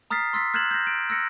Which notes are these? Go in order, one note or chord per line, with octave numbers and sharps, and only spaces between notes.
A#5 D#6 F6 A6 B6 C7
C6 E6 A6 B6
F6 F#6 G#6 A6 E7 F#7
G6 A#6
D7
E6 F#6 A#6 C#7